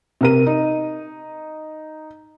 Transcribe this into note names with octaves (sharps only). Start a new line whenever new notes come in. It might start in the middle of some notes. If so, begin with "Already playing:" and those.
C3 A#4 D#7
D#4